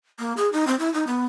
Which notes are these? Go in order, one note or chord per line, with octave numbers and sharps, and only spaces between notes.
A#3
G#4
D#4
C4
E4
D#4
B3